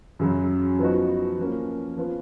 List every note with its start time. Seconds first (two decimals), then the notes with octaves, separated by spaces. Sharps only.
0.19 F#2 C#3 F#3
0.79 F3 B3 D#4 F#4
1.38 F3 A#3 C#4
1.97 F3 B3 F4